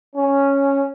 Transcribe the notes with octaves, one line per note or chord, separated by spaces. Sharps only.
C#4